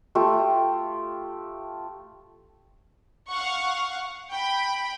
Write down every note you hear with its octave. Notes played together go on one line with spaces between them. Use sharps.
A3 F4 G4
F5 F#5 C#6
G5 B5